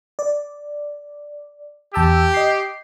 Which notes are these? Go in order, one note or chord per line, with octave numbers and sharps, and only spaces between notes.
D5
E2 G4 A5 E6
D#5 C7